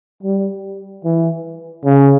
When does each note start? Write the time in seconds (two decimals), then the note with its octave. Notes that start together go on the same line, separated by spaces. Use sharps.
0.23 G3
1.05 E3
1.85 C#3